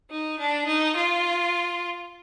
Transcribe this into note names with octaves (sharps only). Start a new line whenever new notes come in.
D#4
D4
D#4
F4